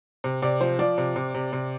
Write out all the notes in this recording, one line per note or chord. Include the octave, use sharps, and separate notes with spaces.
C3
C3 D5
F3 C5
F3 D5
C3
C3
C3
C3